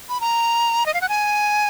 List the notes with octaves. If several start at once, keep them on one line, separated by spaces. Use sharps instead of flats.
B5
A#5
D#5
F5
F#5
G#5